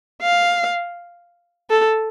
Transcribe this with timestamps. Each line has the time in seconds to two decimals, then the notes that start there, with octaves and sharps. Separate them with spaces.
0.22 F5
1.70 A4